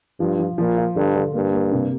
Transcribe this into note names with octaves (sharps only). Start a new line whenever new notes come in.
G2 F3
F3
A#2 F3
F4
G2 D3
D3
G2 A#3
A#3
C3